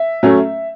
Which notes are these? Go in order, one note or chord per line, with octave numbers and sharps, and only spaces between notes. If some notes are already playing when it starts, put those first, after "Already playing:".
Already playing: E5
F#3 A3 C#4